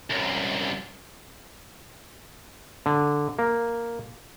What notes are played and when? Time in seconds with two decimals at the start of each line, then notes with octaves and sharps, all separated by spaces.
0.10 C2 F#2
2.86 D3
3.39 A#3